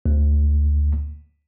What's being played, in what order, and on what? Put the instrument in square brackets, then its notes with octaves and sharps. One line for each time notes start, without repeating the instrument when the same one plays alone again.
[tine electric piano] D2